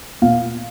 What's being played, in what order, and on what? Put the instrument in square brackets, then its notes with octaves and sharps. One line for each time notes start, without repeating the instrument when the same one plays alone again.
[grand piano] A#2 F5